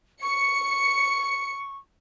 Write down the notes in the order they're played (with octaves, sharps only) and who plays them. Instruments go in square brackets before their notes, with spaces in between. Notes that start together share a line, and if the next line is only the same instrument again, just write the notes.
[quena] C#6 [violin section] C#7